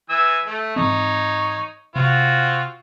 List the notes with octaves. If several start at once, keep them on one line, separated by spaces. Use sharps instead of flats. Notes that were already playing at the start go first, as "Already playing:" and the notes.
E3 G#5 E6
A3
G#2 E3 C4 D#4 C#5
C3 C4 F4 F#4